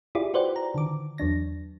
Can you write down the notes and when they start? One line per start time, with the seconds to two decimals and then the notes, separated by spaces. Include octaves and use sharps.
0.15 E4 F4 G4 G#4 D5
0.34 F#4 B4 C5 D5 F#5 G5
0.56 A#5
0.74 D3 D#3 D6
1.18 E2 F#3 D4 A#6